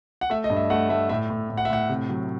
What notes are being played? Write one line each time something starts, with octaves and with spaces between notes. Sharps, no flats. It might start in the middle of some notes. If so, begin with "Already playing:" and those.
F#5
A3 E5
D#5
G2
E5
A3 F#5
A3 E5
A2 E5
A2
A2
F#5
E5
A2 F#5
C3
F#3